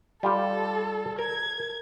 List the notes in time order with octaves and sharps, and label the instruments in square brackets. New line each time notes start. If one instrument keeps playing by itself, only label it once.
[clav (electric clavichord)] G3 F4 G4 [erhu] A4
[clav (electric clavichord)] A#4 [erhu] G#6